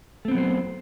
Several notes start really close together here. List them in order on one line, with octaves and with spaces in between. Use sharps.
A3 C4 B3 F#3 C5